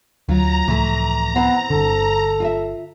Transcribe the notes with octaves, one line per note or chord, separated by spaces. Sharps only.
D2 F#3 F4 A#5
C#2 A2 E3 F3 A3
B3 C4 E4 C5
G1 D3 A4
F4 D#5 E5